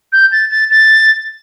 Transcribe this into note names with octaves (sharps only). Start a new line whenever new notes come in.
G6
A6
A6
A6